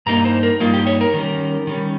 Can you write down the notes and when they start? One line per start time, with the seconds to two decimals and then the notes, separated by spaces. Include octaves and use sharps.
0.06 G2 G3 A#3 D#4 A#5
0.25 C5
0.43 A#4
0.60 G2 G3 A#3 D#4 F4
0.74 G4
0.87 C#5
1.01 A#4
1.14 D#3 G3 C#4
1.67 D#3 G3 C#4